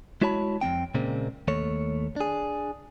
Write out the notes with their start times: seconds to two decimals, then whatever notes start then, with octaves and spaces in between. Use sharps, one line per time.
0.22 G#3 E4 F#4 C#5 A5 B5
0.61 F2 F#3 C4 G5
0.95 A#2 C#3 G#3 A#3 C4
1.48 D#2 A3 C#5
2.16 D4 G#4